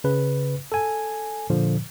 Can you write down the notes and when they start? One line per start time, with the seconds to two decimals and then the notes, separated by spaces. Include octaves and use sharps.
0.04 C#3 B4
0.72 A4 G#5
1.50 A#2 D3 F3